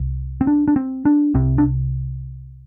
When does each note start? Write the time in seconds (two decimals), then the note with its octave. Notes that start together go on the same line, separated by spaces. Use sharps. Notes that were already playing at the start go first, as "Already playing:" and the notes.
Already playing: C2
0.41 C4
0.47 D4
0.68 D4
0.76 C4
1.05 D4
1.34 C2 C3 C4
1.58 D4